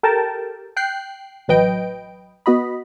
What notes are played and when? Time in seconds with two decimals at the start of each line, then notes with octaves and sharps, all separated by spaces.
0.03 G4 A4 A#4 G5 A5
0.77 G5 F#6 C7
1.48 A1 F#3 B4 D#5 G5 D7
2.46 B3 F#4 D#5 B5